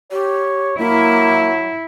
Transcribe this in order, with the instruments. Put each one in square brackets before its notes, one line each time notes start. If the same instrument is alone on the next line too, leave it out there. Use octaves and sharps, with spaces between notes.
[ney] G4 [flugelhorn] C#5
[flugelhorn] F#3 [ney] A#3 [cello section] E4